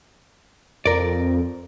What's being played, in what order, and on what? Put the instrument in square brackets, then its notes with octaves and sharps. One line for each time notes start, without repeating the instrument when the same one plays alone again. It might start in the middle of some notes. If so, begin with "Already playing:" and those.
[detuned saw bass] F2 [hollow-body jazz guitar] A#4 D5